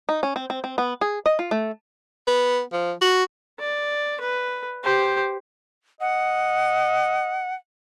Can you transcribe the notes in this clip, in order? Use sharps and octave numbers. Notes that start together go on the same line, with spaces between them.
D#4
C#4
C4
C4
C4
B3
G#4
D#5
F4
A3
B3
F3
F#4
D5
B4
G4 C5
D#5 F#5